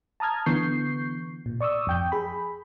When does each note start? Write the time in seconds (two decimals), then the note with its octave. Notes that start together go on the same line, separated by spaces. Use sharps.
0.20 A5 A#5 D#6 F6 G#6
0.46 D3 E3 B3 C#6 G6 C7
1.46 A#2
1.61 D5 C#6 D#6 E6
1.87 F2 G5 G6
2.12 G#4 B5